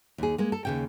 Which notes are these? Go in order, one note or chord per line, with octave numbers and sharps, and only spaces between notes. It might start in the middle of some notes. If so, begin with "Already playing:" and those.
D#2 G#4
G#3 A#3
A4
D#2 C#3 G5